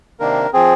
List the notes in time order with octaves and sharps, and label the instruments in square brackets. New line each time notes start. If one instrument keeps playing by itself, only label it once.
[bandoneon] C3 D#3 A#3 D4 A#4
F3 C4 G#4